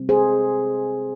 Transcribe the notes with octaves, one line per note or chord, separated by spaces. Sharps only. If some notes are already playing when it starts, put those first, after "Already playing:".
Already playing: C3 G3 C4
G#4 C5